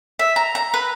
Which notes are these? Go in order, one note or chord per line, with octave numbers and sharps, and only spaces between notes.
E5
A#5
A#5
B4